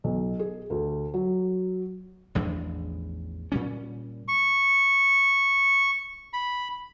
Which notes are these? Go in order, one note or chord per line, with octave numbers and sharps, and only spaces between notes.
B1
G#4
D2
F#3
A1 E2 F3 D4
A#2 G3 C#4
C#6
B5